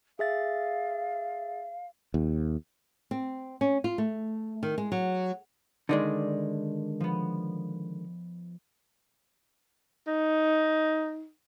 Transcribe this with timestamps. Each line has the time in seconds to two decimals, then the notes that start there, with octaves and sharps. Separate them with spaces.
0.19 G#4 E5 F5 A6
2.14 D#2
3.11 C4
3.61 C#4
3.84 F4
3.98 A3
4.63 D#3
4.78 G#3
4.92 F#3
5.89 D3 D#3 G#3 D5 D#5
7.00 F3 B3
10.07 D#4